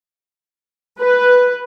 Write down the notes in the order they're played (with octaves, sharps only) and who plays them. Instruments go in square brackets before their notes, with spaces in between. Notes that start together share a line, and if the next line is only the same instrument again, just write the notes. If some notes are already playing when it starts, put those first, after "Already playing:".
[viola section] B4